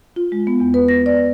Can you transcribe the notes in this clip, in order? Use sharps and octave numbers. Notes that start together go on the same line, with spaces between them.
F4
G#3
B3
E2
B4
A#6
D5